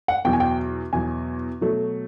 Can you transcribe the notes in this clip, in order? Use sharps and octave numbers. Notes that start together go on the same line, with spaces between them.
F#5
E2 B2 F#3 G5
G#5
G5
E2 B2 F#3 G#5
B2 F#3 A3